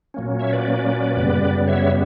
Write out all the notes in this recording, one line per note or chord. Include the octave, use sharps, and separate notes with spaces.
A#2 F#3 A#3 C#4
C#5 E5
B4 D5
F#2 C#3 G3 B3
C#5 E5